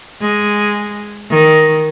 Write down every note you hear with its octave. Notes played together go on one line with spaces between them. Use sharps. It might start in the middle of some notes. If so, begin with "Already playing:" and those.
G#3
D#3